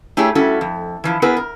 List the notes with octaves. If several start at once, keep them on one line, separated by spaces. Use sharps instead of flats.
A3 E4 G4 G#4 C#5
G3 C#4 E4 F#4 A4
F2
E3 F3 E4
B3 E4 G#4 A#4 B4
A#4